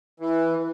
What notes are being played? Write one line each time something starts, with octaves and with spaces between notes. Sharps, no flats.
E3